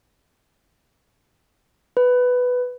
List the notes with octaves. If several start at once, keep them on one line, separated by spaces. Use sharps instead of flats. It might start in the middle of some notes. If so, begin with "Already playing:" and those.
B4